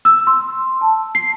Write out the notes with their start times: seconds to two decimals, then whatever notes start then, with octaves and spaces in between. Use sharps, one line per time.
0.05 E6
0.27 C6
0.81 A5
1.15 C7